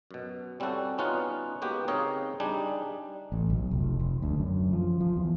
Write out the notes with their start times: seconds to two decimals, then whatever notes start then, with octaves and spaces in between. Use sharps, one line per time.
0.11 F#2 B2
0.60 G3 C4 C#4 E4 F#4 A4
0.98 B3 C#4 D#4 F4 F#5
1.62 G#3 A#3 B3 F#4 G4
1.88 C#3 C4 D#4 C#5 D#5 F5
2.40 G3 D4 D#4 G#4
3.32 A1
3.50 B1
3.71 F1
4.00 F1
4.22 D2
4.40 F#2
4.73 F3
5.00 F3
5.16 E2